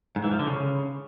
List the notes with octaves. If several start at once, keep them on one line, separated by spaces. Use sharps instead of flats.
G#2
E3
F3
D3
C#3